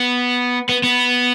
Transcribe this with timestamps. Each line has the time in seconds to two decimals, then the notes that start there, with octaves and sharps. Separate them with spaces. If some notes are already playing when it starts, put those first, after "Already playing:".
Already playing: B3
0.69 B3
0.83 B3